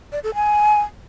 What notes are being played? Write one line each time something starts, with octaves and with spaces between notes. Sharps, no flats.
D5
A4
G#5